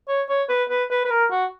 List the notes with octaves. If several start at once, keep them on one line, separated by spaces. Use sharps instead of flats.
C#5
C#5
B4
B4
B4
B4
A#4
F#4